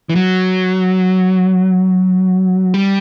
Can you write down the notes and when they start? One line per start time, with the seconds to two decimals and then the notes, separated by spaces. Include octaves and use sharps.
0.10 E3
0.16 F#3
2.74 G3